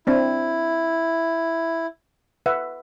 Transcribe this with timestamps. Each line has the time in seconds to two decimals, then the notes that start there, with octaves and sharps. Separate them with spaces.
0.07 C4 D4 E4
2.46 B4 E5 F#5